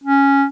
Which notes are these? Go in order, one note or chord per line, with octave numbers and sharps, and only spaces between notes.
C#4